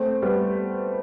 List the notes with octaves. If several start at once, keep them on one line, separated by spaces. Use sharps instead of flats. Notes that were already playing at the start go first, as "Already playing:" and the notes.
Already playing: A3 C4
G3 B3